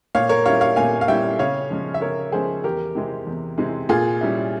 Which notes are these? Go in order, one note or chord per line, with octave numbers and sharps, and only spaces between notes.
A#2 C#5 F5
A#4 C#5
G3 C#4 E4 C#5 F5
C#5 F5
A#2 F5 G#5
F5
G3 C#4 E4 E5 G5
C#3 C#5 F5
F3 G#3 C#4
E5
C#3 A#4 C#5
F3 G#3 C#4 G#4 C5
E2 G4 A#4
C3 E3 G#3 C4
E2
C3 E3 G#3 C4
A#2 F4 G#4
G3 C#4 E4